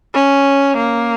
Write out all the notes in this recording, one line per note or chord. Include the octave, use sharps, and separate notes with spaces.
C#4
A#3